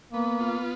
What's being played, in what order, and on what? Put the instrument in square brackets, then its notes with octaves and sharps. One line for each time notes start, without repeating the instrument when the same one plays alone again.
[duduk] A#3 [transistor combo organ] B3
[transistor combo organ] F4